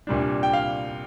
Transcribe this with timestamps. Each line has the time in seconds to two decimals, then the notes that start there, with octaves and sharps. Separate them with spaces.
0.07 C2 A#2 G3 D4
0.43 G5
0.53 F5